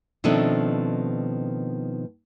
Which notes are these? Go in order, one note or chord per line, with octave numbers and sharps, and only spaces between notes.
B2 D#3 F3 A3 C4 D4